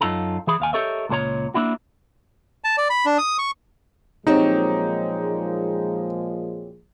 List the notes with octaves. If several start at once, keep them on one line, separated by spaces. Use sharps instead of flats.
F#2 D#4 F4 A4 A#5
E3 G#4 B5
D#2 F5 G#5
G4 A4 A#4 C#5 D#5 E5
C#2 A#2 A4 C#5 A#5
A#3 D4 E4 F#4
A5
D5
B5
D4
D#6
C#6
A#2 F3 F#3 G#3 C4 D#4 G4